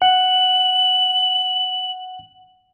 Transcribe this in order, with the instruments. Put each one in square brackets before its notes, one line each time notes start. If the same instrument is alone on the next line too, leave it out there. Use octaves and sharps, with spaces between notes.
[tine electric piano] F#5 [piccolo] F#7